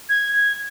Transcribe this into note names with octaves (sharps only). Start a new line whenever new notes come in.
G#6